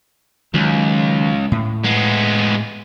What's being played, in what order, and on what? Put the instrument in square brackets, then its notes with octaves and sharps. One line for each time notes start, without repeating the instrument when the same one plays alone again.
[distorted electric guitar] C#2 [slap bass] D#3 F#3
[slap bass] A2
[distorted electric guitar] G#3 B3